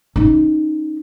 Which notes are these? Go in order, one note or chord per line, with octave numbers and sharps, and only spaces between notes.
C#4 D#4